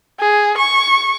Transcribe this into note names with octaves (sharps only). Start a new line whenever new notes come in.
G#4
C#6